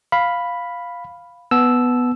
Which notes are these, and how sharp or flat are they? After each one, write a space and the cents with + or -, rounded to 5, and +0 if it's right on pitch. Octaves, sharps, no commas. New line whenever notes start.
F5 +5 B5 +0
B3 +0 A5 -25 E6 +0